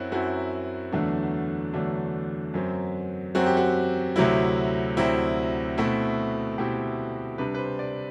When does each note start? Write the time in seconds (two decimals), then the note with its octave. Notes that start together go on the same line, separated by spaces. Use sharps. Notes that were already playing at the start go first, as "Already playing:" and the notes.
Already playing: F#2 F#3 C4 E4 F#4
0.12 F#2 F#3 C4 E4 F#4
0.92 E2 D3 F#3 A3 D4
1.74 E2 D3 F#3 A3 D4
2.54 F#2 F#3 C4
3.35 F#2 F#3 C4 F#4
3.46 G4
3.57 F#4
4.16 D2 C3 F#3 C4 E4
4.97 D2 C3 F#3 C4 E4
5.77 B2 A3 C4 E4
6.58 B2 A3 C4 E4 G4
7.38 C3 G3 D4 B4
7.55 B4
7.59 C5
7.79 D5